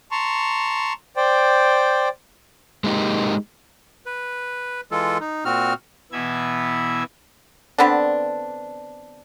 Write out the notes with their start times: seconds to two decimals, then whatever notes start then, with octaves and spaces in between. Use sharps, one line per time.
0.11 A5 A#5 C6 C#6
1.16 C5 D5 G5
2.84 G#3 A#3 D#4 G4
4.06 B4
4.91 E3 G#3 F4 A4
5.20 D#4
5.45 A#2 C4 F#4 F6
6.12 B2 E3 B3 E5 G#6
7.78 D3 B3 C4 D4